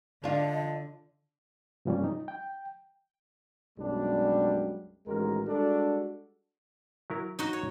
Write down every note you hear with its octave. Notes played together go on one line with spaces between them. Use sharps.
D3 D4 F4 D#5
G2 C3 F3 G3 A#3 C#4
D#4
G5
B1 F#2 G3 G#3 D4 G4
A1 D#3 G#3 F#4 A#4
G3 G#3 D4 F#4 A4
F#3 E4 A#4
D#4 F#4 D#5
C#5